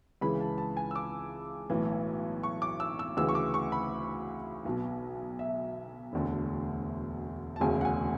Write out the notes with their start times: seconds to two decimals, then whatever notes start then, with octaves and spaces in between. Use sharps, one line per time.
0.21 C#2 C#3 E3 B5
0.40 A5
0.58 A5
0.77 G#5
0.91 E6
0.96 D6
1.70 B1 A2 E3
2.43 C#6
2.62 D6
2.80 E6
2.99 E6
3.17 D2 C#3 E3 E6
3.29 C#6
3.35 D6
3.54 C#6
3.72 B5
4.65 B1 B2
5.39 E5
6.13 E1 D2 D3
7.56 A5
7.60 E1 D2 C#3 G#5
7.81 F#5
7.85 G#5